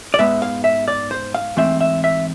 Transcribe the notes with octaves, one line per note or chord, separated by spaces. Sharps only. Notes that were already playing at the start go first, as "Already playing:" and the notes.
D5
G#2 G#3 B3 E5
F5
E5
D5
C5
F5
G#2 E3 A3 C4 E5
E5
E5